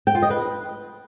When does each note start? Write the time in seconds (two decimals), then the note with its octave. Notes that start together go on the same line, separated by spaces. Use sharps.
0.07 G5
0.15 F4
0.22 D#5
0.30 B4